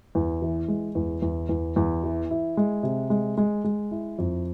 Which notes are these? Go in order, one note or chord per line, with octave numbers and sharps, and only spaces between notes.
E2
E3
G#3
E2
E2
E2
E2
E3
E4
G#3
C3
G#3
G#3
G#3
E4
F2